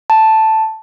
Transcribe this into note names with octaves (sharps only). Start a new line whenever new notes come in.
A5